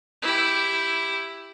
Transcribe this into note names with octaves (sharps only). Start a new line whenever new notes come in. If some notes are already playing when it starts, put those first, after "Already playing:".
E4 G4